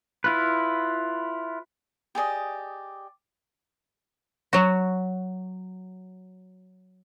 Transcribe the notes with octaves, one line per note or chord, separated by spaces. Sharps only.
E4 F4 B4
G4 G#4 D5 D#5
F#3 F#4